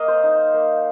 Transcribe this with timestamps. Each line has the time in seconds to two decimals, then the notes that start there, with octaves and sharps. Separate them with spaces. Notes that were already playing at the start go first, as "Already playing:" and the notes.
Already playing: A#3 D#5 F5
0.08 C5
0.23 D#4
0.54 A#3